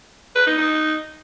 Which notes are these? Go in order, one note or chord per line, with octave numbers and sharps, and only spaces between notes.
B4
D#4
D#4